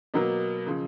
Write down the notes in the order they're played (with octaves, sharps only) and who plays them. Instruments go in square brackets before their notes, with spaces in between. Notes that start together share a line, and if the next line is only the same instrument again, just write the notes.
[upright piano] B2 F#3 A#3
C#3 F3